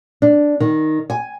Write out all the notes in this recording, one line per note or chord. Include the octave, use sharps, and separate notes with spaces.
D4
D#3
G#5